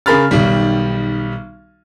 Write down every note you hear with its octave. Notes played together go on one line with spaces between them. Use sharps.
C#3 G#4 A#4 B5 F6 A6
B1 D#3 G3